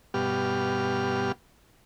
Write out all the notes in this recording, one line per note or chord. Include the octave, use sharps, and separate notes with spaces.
G2 B2 G4 F6